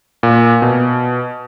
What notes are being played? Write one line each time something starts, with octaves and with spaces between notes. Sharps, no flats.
A#2
B2